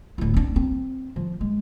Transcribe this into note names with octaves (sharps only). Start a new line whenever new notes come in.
D1 E4
C4 D4
C4
F3
G#3